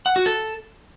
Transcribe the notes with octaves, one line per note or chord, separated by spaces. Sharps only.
F#5
F#4
A4